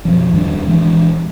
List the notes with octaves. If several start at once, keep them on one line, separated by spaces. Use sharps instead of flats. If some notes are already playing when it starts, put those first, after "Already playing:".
F#2 B2 F3
D#2 D#3 G3 D4
D#1 E3 G#3 D4